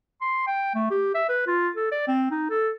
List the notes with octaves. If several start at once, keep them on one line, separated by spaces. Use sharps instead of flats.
C6
G5
A3
G4
E5
B4
F4
A4
D5
C4
D#4
A4